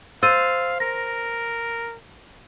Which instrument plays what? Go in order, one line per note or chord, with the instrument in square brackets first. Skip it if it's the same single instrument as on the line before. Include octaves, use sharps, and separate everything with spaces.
[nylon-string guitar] C5 [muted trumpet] F5 [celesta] E6 A6 D#7
[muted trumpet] A#4 [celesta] A#6